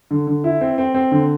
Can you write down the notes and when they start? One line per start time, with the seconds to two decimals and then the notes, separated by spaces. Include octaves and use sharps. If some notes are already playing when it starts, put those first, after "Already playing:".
0.11 D3
0.27 D3
0.44 E4
0.61 C4
0.78 C4
0.95 C4
1.11 D3